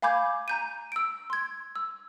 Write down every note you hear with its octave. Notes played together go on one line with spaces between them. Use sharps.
F5 G#5 B5 D6 G6 G#6
A#5 G6 D#7
E6 D7
C6 G#6
E6